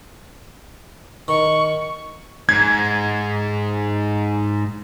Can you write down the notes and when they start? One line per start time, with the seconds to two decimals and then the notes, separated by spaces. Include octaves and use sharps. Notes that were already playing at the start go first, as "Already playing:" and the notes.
1.28 D#3 C#6
2.49 G#2 G#6